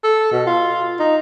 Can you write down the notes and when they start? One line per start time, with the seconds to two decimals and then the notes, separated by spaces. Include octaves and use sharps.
0.04 A4
0.32 B2
0.47 F4
1.00 D#4